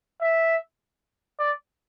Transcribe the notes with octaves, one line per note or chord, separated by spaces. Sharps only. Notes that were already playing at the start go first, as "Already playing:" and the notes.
E5
D5